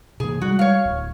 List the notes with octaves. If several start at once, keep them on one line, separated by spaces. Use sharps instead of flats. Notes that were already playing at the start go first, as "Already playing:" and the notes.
C3 E3 A#3 G#4
G3 G#3 F#4
C#5 F5
D1